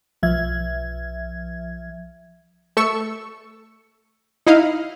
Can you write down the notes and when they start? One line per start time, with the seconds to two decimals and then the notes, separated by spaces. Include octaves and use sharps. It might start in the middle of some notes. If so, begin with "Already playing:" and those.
0.23 B1 F3 E5 G#6
2.77 A3 A4 C#6 E6 C#7
4.47 D#4 E4 D#5 F5